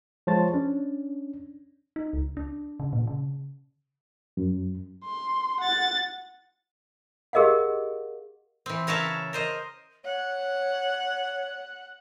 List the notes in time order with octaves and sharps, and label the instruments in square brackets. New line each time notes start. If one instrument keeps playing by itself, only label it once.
[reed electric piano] F3 G#3 C5 C#5 A5 A6
C#4 D4
[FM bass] D#4
C#2
D4
C#3
A#2
C#3
[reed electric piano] F#2
[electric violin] C6
F#5 A6
[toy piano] G4 G#4 A#4 D#5 F5 F#5
[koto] E3 C4
C#3 A#4 C#5 E5 A5
A#4 C5 D#5
[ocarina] C#5 [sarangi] F#5